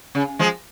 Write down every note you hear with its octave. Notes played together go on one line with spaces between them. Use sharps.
C#3
F3 G#3